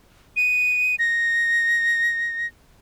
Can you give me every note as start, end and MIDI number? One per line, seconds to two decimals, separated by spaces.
0.36 0.95 99
0.99 2.47 94